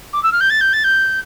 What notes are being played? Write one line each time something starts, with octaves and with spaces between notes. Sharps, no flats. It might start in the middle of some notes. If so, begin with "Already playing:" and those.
D6
E6
F6
G6
A6
G6
A6
G6